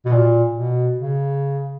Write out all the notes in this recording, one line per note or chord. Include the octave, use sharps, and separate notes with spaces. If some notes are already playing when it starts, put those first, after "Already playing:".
B2
A#2
B2
C#3